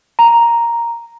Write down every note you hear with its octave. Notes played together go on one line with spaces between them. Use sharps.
A#5